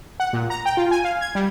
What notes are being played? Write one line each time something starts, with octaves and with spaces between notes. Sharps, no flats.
F#5
A#2
A#5
G5
F4
G#5
F5
G#6
G3